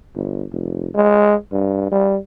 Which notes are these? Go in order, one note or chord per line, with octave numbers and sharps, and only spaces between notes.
G1
F1
G#3
G2
G3